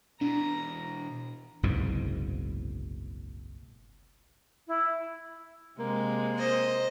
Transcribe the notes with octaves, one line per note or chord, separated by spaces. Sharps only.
B2 E3 D4 A#5
F#1 C2 G#2 B2
E4
C3 G#3 A#3
C5 D#5